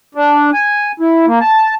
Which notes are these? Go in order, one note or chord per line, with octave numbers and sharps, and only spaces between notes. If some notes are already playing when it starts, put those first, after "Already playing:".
D4
G#5
E4
A#3
A5